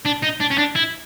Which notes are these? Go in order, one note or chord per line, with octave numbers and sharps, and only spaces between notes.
D4
D#4
D4
C#4
D4
E4